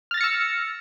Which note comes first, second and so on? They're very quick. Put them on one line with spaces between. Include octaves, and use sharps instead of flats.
F6 A6 A#6 C#7 E6